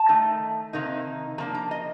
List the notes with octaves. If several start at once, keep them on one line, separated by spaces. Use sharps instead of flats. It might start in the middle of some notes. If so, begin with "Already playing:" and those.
Already playing: A5
D#3 A3 D#4
C3 D#3 A#3 D#4
F3 A#3 D4 A#5
A#5
D#5